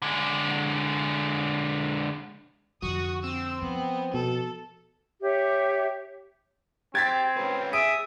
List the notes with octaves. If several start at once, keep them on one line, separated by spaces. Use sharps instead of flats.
D3 G#3
F2 D3 F#4 C#6 D#6
C4 E6
F3 B3
B2 A4
G4 C#5 E5
C4 G4 G#6 A6 B6
C#4 B4
G#4 E5 D#6 D7